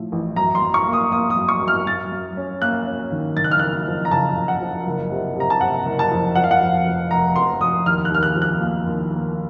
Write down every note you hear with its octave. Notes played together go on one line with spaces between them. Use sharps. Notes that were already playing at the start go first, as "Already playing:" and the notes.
Already playing: A2 F3
A1
F#2 A#5
C6
F#2
C#6
A#3
D#6
A#3 D#6
D#6
F#2
C#6
F#2
F6
F#2 A6
F#2
C#4
A#3 F#6
C#4
D#3
F#1 A6
F#6
F6
F#1 F#6
F3
A#5
C#3 A5
C#3
F#5
F3
F#1
C3
C3 A#5
A5
C3 F#5
F#1
A5
F2
F3 F#5
F5
F#5
F2
F1
F1 A#5
F1 C6
F1 D#6
D#2 F6
F#6
D#2 F6
F#6
F3
F#6
A#3
D#2
A#3